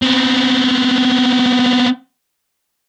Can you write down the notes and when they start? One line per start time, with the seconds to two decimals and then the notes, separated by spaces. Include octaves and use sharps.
0.02 B3 C4